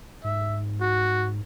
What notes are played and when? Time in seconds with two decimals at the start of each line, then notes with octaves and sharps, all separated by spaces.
0.24 G#2 E5
0.81 F#4